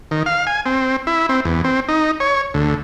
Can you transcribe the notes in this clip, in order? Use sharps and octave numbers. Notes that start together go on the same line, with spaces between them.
D#3
F5
G#5
C4
E4
C4
E2
C4
D#4
C#5
D2